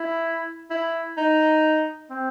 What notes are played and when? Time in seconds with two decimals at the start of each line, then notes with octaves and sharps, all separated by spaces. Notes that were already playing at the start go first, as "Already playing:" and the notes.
Already playing: E4
0.70 E4
1.17 D#4
2.10 C4